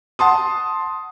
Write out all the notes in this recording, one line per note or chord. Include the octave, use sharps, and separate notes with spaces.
F#5 A5 C6 D#6